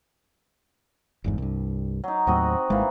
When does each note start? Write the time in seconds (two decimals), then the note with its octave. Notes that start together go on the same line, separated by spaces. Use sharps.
1.24 G1 E2 G#2
1.38 C2 G2
2.04 F#3 D#4
2.27 D#2 A2 F#3 C4 F#4 D#5
2.70 G#1 E3 G#3 A#3